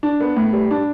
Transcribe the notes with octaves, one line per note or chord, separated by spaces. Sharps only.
D4
B3
A2
G3
D4